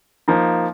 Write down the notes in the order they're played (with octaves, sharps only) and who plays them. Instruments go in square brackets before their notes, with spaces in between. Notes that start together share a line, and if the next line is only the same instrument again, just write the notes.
[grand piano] F3 A#3 D#4